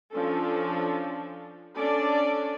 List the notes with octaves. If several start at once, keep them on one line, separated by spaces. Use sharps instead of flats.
F3 C#4 D4 A4
C#4 D4 A4 D5